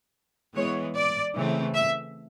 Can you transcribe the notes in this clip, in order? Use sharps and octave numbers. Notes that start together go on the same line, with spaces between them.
E3 G#3 B3 C#5
D5
C#3 E3 A3 C4
E5